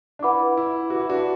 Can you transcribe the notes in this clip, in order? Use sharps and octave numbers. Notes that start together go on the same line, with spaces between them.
D4
E4 B4 F#5 B5 D6
E4
F#4 B4 F#5 B5 D6
E4
D4 F#4